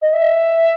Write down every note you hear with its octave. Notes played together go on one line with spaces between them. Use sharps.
D#5
E5